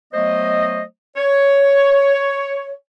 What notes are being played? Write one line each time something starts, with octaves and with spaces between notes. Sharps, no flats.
F#3 A3 B3 C5 D#5
C#5